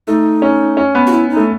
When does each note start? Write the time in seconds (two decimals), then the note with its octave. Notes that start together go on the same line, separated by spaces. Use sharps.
0.07 A3 D#4
0.42 C#4
0.77 C#4
0.95 B3
1.07 F#4
1.12 E4
1.30 D#4
1.36 A3